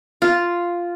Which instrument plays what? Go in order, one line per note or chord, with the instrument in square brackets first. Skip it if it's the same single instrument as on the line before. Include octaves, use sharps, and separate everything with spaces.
[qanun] F4